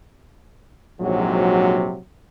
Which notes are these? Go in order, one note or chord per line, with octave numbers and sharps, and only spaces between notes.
A#1 G#2 C3 F#3